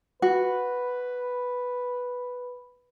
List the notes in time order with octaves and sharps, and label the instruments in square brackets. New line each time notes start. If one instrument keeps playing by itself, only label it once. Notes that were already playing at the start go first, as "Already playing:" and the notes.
[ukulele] F#4 [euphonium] B4